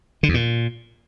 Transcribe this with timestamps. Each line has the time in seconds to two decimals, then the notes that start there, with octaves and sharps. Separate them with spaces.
0.23 D3
0.29 E2
0.34 A#2